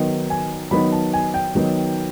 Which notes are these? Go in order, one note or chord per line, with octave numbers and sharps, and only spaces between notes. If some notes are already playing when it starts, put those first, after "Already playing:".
Already playing: D#3 F#3 B3 D#4
G#5
D#3 F#3 B3 D#4 B5
A5
G#5
G5
D#3 F#3 B3 D#4